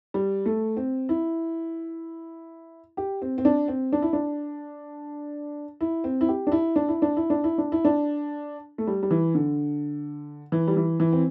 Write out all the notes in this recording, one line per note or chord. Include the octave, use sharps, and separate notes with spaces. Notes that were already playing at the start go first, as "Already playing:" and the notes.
G3
A3
C4
E4
G4
C4
C4
D4
C4
D4
E4
D4
E4
C4
E4
G4
D4
E4
D4
E4
D4
E4
D4
E4
D4
E4
D4
A3
G3
G3
E3
D3
E3
G3
E3
E3
C4